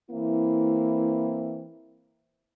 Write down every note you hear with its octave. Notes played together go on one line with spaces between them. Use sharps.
E3 A#3 C4 E4